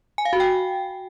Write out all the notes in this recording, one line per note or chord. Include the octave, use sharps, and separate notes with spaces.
G#5
F5
F#4
G5